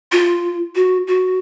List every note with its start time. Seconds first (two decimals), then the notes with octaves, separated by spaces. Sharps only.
0.12 F4
0.75 F#4
1.07 F#4